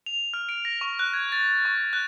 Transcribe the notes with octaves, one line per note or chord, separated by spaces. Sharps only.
F7
F6
D7
A#6
C#6
F#6
G#6
A6
C#6
F#6